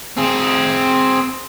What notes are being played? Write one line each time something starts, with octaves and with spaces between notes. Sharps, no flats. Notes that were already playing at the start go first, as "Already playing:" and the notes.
C4 G#4